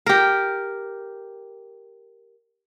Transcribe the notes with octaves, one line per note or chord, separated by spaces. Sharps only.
G4 A#4